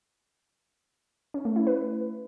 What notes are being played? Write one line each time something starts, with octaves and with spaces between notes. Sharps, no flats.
C#4
A3
E4
B4